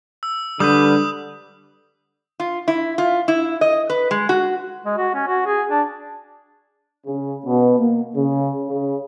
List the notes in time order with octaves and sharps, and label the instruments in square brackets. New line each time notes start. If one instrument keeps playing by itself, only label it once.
[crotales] E6
[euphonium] D3 [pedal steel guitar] G3 B4 [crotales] D#6 G6
[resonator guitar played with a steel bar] F4
E4
F4
E4
D#5
B4
G#3
F#4
[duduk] G#3
F#4
C#4
F#4
G#4
D4
[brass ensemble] C#3
B2
A#3
C#3
C#3